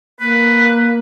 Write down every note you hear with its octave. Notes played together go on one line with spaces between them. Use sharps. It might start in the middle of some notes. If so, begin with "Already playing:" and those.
A#3 B4